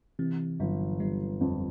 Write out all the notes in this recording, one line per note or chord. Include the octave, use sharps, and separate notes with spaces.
C3 E3
G1 F#3
G1 G3
F2